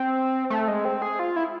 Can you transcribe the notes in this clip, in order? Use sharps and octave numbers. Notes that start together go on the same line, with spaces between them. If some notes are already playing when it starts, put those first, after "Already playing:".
Already playing: C4
A3
G#3
C4
G#4
F4
E4